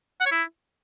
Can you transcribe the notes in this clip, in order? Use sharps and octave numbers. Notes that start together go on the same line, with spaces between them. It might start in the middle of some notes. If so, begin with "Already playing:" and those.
F#5
C#5
E4